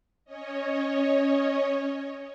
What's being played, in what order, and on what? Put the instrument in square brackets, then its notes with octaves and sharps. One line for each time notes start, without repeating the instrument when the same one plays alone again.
[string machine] C#4 C#5 D#5